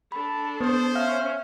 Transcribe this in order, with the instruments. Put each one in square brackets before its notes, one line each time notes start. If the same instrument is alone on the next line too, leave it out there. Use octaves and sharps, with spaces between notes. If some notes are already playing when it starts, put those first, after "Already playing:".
[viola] D4 A4 [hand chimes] B5
[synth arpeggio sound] B3 [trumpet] C5 [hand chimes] D#6 C#7
[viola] C#4 [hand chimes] E5 G5 F6 [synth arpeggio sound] F5